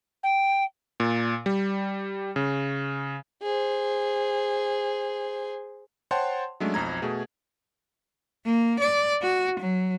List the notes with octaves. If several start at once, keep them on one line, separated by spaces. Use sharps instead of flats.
G5
A#2
G3
C#3
G#4 C5
C5 C#5 F#5 G5 A5 C6
F#3 G#3 A3 C#4 D4
B1 F2 A#5 G#6
B2 A3 G#4
A#3
D5
F#4
F#3